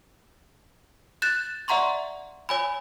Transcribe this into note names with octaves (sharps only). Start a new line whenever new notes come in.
F#6 G6 A6 E7
D5 E5 F#5 A#5 C6 C#6
C#5 G#5 B5